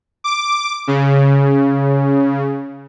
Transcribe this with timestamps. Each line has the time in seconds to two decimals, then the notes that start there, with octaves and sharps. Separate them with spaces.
0.24 D6
0.87 C#3